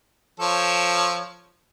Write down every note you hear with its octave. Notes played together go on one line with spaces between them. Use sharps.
F3 A4 C#5